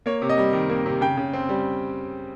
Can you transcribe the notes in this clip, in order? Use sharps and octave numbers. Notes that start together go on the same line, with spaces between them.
A#3 C#5
C3
D#5
G3
D#3
A#3
C3
C#3 G5
C#3
C4
G3